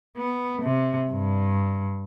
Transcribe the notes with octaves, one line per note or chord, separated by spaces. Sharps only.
B3
C3
G2